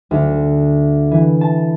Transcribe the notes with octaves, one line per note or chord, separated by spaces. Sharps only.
D2
E3
A5